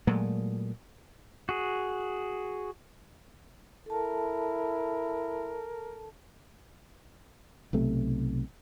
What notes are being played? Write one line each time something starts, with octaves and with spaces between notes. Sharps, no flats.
A#2 F#3 G#3 A3
F#4 G#4
E4 A4 A#4 A5
B1 C3 A3